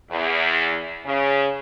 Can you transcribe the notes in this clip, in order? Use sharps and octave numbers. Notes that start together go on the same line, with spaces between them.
E2
C#3